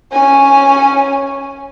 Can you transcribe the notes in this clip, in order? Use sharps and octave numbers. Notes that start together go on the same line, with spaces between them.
C#4 G#5